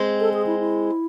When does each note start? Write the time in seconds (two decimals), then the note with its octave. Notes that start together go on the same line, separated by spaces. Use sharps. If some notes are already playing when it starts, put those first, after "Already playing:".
Already playing: G#3 C4
0.20 A4
0.33 G#4
0.46 E4
0.59 E4